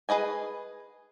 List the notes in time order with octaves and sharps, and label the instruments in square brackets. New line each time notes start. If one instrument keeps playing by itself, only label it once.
[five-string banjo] G#4 B4 D#5 G#5